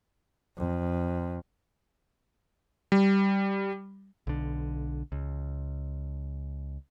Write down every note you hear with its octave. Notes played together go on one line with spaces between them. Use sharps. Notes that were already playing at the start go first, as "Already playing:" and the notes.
F2
G3
B1 D3
C#2